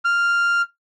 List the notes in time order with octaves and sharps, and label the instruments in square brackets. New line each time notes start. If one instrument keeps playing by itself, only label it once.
[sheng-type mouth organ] F6